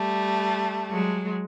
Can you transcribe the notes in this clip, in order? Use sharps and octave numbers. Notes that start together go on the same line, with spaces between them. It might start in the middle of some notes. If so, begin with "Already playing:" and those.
Already playing: G3 A3
F#3 G#3